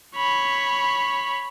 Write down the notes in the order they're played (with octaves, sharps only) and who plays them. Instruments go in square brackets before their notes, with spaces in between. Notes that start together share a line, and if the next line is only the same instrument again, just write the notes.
[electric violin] C#5 B5